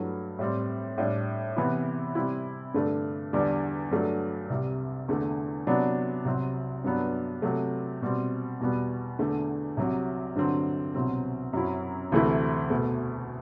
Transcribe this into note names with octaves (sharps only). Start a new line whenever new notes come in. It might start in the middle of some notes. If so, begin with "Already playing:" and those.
Already playing: G2 F#3 A3 E4
A2 G3 C4
A2 G3 D4
C3 E3 B3 E4
C3 G3 C4 E4
G2 D3 A3 D4
E2 D3 G3 D4
G2 F#3 A3 D4
C2 C3 G3
E2 D3 A3
C3 F#3 B3 D4
C2 C3 F#3 C4
G2 F#3 B3 D4
C3 F#3 A3
B2 G3 C4
E2 B2 G3 B3
E2 D3 A3
C2 C3 F#3
G2 D3 F#3 C4
C2 B2 F#3 C4
F#2 F#3 C4 E4
D2 C3 E3 A3 E4
E2 B2 A3